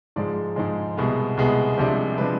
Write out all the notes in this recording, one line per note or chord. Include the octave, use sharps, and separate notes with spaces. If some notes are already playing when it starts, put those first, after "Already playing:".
G#2 F3 G#3 D5
G#2 F3 G#3
C2 B2 G#3 B3
C2 B2 G#3 B3
C2 C3 F3 G#3 D4 C5
C3 F3 G#3 D4 B4